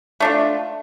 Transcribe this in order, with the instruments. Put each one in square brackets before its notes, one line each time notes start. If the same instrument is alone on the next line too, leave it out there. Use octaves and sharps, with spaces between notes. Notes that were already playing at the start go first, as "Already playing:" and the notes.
[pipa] A3 D4 F4